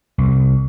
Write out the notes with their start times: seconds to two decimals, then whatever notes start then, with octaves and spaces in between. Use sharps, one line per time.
0.18 C2